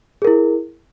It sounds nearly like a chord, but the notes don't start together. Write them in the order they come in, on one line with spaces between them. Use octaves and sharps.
G#4 A#4 E4